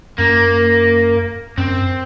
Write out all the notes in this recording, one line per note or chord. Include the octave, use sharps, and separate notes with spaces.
F#2 A#3
F#2 C4